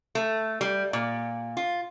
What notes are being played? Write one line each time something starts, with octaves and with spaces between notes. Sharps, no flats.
A3
G3
A#2
F4